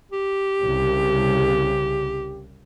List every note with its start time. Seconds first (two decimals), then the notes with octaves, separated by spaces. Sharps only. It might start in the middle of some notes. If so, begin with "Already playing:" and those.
0.12 G4
0.60 C2 C#3